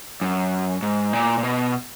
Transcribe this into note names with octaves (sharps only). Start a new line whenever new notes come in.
F#2
G#2
A#2
A#2
B2